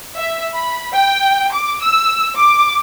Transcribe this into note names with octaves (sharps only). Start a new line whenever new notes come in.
E5
B5
G5
D6
E6
D6